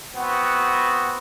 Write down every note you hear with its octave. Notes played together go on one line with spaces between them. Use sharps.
B3 C4 F#4